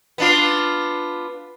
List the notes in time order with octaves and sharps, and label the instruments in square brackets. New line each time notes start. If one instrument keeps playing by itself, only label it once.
[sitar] B3 D4 F4